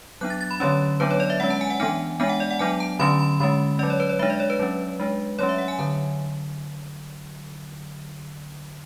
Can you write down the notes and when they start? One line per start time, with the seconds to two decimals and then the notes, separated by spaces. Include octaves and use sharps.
0.21 F#3 B3 D4 F#6
0.30 A6
0.41 A6
0.51 B5
0.60 D3 F#3 A3 C#4 C#5
1.00 F#3 B3 D4 B4
1.11 C#5
1.20 D5
1.30 E5
1.40 G#3 C#4 F#5
1.50 A5
1.61 G#5
1.70 F#5
1.80 E3 B3 D4 G#5
2.20 G#3 B3 D4 G#5
2.29 F#5
2.40 D5
2.51 F#5
2.59 F#3 B3 D4 G#5
2.80 A5
2.99 D3 F#3 A3 C#4 B5
3.19 B5
3.40 D3 G#3 C#4 B5
3.79 F#3 C#4 D5
3.90 C#5
4.00 B4
4.09 C#5
4.19 G#3 D4 E5
4.30 D5
4.40 C#5
4.50 B4
4.59 F#3 C#4
5.00 G#3 D4
5.39 F#3 A3 C#4 C#5
5.49 E5
5.58 F#5
5.68 G#5
5.79 D3 F#3 A5